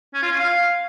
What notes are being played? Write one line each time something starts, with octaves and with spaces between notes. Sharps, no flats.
C#4
F4
C#4
F5